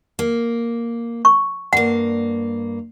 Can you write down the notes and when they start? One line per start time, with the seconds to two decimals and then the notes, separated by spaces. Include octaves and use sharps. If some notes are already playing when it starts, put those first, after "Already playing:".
0.19 A#3
1.25 C#6
1.73 G2 A#3 F#5